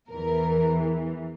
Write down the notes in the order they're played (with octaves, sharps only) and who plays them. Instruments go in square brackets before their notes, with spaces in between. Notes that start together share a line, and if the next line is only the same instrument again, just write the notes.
[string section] E2 E3 A#4